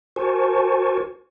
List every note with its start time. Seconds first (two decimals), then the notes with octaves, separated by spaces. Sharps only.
0.16 F#4 A#4 C5 G#5 A5 C#6